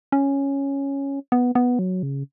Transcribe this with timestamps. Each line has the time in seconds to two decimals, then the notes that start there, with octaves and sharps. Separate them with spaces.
0.12 C#4
1.32 B3
1.55 B3
1.79 F#3
2.03 C#3